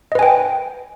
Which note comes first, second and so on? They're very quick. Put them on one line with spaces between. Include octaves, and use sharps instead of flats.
D#5 B4 G#5 G5